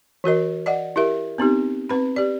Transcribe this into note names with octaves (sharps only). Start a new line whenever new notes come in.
E3 F#4 A#4 D#5
D5 D#5 F#5
E4 G4 A#4 E5
B3 C4 D#4 G4
C4 B4 B5
G4 D5